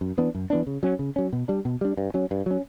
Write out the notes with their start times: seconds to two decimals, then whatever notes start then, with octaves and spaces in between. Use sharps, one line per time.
0.01 F#2
0.18 E3 B3 D4
0.35 F#2
0.50 E3 B3 D4
0.67 C#3
0.83 F#3 C#4
0.99 C#3
1.16 F#3 C#4
1.33 B2
1.48 G3 D4
1.65 B2
1.81 G3 D4
1.97 G2
2.14 F#3 C#4
2.31 G2
2.46 F#3 C#4